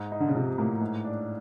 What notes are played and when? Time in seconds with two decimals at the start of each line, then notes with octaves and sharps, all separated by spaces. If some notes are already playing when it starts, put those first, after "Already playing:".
Already playing: G#2
0.12 D#4
0.20 D3
0.28 C#3
0.35 C3 F3
0.58 A2 A#3
0.81 G#2
1.05 D4